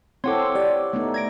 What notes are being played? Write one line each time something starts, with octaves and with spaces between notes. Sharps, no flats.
C4 E4 A4 C#5 F#5 C6 D6
G4 D5
A3 B3 D#4
G#6 A#6 D7